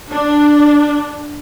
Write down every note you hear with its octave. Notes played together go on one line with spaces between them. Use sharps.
D4